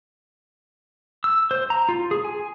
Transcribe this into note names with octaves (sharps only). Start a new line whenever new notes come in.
E6
C5
A#5
F4
G#4
G#5